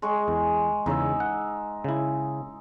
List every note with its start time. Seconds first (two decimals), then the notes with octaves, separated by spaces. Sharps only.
0.02 G#3 G#4 C#6
0.28 E2
0.86 E2 C#3 D#4 E5
1.20 F#5
1.84 C#3 E4